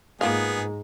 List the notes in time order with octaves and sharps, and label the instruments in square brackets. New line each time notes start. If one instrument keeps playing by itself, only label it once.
[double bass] G#2 [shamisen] A#3 F4 F5 [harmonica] B3 G#4